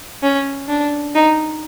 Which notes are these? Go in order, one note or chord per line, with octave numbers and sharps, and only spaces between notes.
C#4
D4
D#4